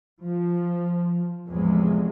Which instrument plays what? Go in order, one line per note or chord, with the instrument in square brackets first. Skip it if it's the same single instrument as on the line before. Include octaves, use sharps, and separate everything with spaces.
[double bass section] F3
E2 A2 C3 F3 G#3